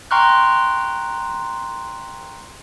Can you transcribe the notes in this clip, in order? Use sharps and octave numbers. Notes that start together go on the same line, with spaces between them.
G5 A#5 C6 C#6 F6 F#6